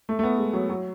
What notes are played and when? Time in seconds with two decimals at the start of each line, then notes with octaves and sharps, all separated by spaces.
0.09 A3
0.19 A3
0.24 B3
0.38 G#3
0.53 F#3
0.69 F#3